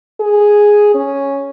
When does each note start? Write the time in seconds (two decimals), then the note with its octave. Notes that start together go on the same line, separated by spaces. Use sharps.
0.20 G#4
0.95 C#4